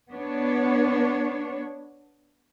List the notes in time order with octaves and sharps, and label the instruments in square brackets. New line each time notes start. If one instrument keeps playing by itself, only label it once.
[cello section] B3 D4 C#5